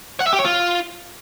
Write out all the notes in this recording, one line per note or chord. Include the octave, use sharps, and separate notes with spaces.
F#5
E5
G4
C#5
F4